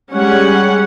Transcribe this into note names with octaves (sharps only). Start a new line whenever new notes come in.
G3 G#3 C#4 F#5